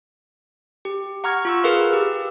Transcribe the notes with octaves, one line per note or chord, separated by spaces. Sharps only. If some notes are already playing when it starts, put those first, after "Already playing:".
G4
F#5 A#5 C#6 F6 G#6
F4 C#6 E6
G#4 A#4 B4 F5
G4 E6